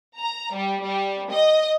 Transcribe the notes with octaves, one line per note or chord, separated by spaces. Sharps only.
A#5
G3
G3
D#5